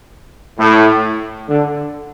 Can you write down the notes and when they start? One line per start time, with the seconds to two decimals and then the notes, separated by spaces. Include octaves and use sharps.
0.59 A2
1.49 D3